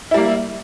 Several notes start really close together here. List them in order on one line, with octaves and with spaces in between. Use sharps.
E4 G3 A#3